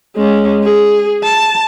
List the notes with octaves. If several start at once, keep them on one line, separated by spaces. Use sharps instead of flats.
G#3 C#4
G#4
A5